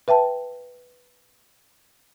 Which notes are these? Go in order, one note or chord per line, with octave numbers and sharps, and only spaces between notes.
B4 E5 G5 A5